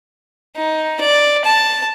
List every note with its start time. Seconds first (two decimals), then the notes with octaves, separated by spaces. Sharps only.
0.56 D#4
1.00 D5
1.44 A5